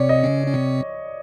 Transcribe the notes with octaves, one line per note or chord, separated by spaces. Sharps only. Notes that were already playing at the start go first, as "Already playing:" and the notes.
Already playing: C3 C4 C#5 D5
D#5
C#3 C#4
C#4
C3 C4